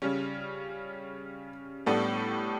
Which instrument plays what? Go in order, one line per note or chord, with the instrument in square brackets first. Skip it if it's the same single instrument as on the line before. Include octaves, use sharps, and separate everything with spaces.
[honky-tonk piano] C#3 G3 C#4
A2 G3 B3 D4 A4